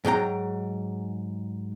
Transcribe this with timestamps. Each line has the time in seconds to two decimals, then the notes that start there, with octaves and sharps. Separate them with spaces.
0.05 G#2 F#3 G5 A#5